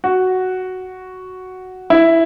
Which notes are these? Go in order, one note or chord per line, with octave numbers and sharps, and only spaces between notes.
F#4
E4